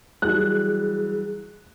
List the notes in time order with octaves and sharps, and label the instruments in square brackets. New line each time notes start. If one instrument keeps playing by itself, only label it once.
[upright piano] E3 F#3 G3 [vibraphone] G#4 [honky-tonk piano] F#6